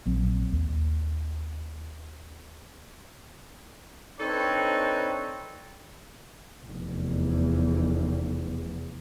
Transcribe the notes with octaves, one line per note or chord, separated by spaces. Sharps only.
A#1 F#3 C4
D#2
C4 D4 D#4 A4 B4 C#5
F1 E2